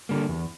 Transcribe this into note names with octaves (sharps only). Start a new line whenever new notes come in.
D3 G3 A#3
E2